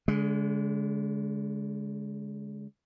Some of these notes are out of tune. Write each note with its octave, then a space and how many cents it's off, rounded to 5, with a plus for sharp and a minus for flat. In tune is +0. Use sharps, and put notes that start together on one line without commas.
D3 -40 G#3 +0